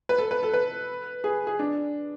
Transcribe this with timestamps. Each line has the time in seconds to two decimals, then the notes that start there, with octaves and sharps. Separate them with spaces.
0.09 B4
0.18 A4
0.31 B4
0.43 A4
0.53 B4
1.24 G#4
1.47 G#4
1.59 D4